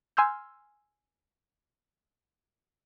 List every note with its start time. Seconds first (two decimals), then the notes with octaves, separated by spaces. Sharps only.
0.17 G#5 C6 E6 F6 G6